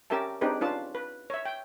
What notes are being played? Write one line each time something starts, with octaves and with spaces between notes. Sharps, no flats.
C#4 G4 A#4 E5 A5
C4 D4 D#4 G4 G#4 B4
C#4 D4 F4 B4 A5
B4
C#5 E5
G5